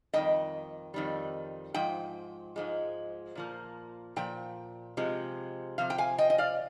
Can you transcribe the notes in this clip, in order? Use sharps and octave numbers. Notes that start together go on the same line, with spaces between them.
F2 D#3 G3 D#5 G5
F2 D#3 G3
G#2 F3 G5
G#2 F3 G#3
A#2 F3 A#3
A#2 F3 G5
C3 F3 G#3
C3 F3 F5
G5
F5 G#5
D#5 G5
D#5
D5 F5